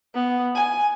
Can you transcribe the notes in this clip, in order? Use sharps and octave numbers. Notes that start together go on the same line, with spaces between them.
B3
G#5